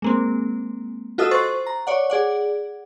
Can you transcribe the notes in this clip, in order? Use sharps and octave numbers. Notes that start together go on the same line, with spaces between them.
G#3 A#3 C4
F4 F#4 A4 D#5 D#6 E6
C5 C#6 F#6 A6
A#5
C#5 D5 F#5
G#4 D5 F#5